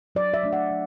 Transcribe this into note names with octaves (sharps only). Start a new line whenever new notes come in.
F#3 D5
E5
A3 D4
F#5
F#3